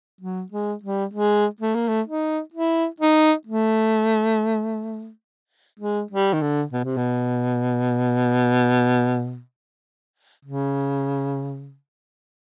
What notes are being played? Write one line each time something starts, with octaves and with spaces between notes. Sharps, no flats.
F#3
G#3
G3
G#3
A3
A#3
A3
D#4
E4
D#4
A3
G#3
G3
D#3
D3
B2
C3
B2
C#3